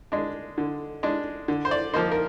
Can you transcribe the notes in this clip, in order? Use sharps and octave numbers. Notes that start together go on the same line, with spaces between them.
G#3 D4
D3
G#3 D4
D3
C5
D5
F3 A#3 D#4 C5
A#4